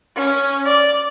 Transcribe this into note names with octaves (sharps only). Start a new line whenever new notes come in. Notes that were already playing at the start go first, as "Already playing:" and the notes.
C#4
D5